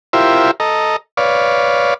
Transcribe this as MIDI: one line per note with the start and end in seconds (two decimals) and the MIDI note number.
0.13 0.51 64
0.13 0.51 65
0.13 0.51 67
0.13 0.51 70
0.13 0.51 72
0.13 0.51 76
0.60 0.96 69
0.60 0.96 75
0.60 0.96 82
1.17 1.94 71
1.17 1.94 73
1.17 1.94 74
1.17 1.94 77